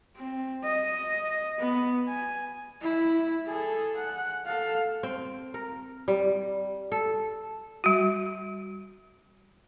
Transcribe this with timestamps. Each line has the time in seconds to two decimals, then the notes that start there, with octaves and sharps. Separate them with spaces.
0.17 C4
0.64 D#5
1.59 B3
2.08 G#5
2.81 E4
3.48 G#4 A4
3.97 F#5
4.46 A4 F5
5.03 C4
5.54 A#4
6.08 G3
6.92 A4
7.84 G3 F#4